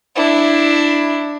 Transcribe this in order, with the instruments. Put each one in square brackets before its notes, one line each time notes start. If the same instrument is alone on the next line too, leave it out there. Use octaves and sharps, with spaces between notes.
[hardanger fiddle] D4 E4